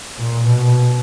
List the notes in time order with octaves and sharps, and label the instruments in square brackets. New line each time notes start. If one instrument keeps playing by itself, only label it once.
[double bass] A#2
B2